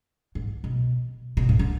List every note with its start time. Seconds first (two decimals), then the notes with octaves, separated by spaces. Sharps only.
0.35 G#2
0.64 B2
1.37 B2
1.49 A2
1.59 D3